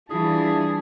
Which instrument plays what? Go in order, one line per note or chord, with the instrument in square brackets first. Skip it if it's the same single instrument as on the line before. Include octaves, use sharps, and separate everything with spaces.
[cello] E3 G3 [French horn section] D4 E4 F4 [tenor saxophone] G#4 [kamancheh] A5